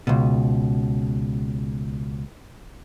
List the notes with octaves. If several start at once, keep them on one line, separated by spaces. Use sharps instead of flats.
C#2 B2